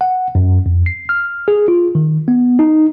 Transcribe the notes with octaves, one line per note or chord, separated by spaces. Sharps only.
F#5
F#2
F2
C7
F6
G#4
F4
D#3
B3
D#4